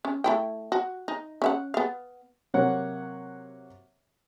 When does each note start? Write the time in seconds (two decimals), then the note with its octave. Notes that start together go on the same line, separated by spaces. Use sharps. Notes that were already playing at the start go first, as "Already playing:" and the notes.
0.05 C#4
0.24 A3 E4 G5
0.72 F#4
1.08 D#4
1.42 C#4 E5 F#5
1.74 B3 F5
2.54 C3 F#3 A#3 C#5 F#5